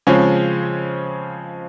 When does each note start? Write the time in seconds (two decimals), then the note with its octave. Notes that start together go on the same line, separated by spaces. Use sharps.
0.07 C#3 F3 G#3 C4 C#4